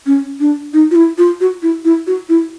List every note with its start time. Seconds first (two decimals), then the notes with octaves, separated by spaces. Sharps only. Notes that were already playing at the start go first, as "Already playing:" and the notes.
0.06 C#4
0.40 D4
0.73 D#4
0.91 F4
0.96 E4
1.18 F4
1.41 F#4
1.63 E4
1.85 E4
2.07 F#4
2.29 E4